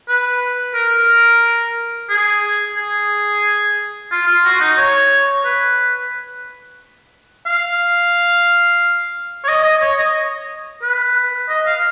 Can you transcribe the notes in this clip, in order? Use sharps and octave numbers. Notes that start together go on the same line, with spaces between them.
B4
A#4
G#4
G#4
F4
F4
F#4
D#4
C#5
B4
F5
C#5
D#5
D#5
C#5
D#5
B4
D#5
F5